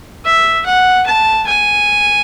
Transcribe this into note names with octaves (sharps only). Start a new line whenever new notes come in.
E5
F#5
A5
G#5